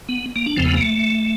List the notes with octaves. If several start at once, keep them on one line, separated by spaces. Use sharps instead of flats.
B3
A#3
D4
E2 C#3 F3 C4
B3
A#3
A3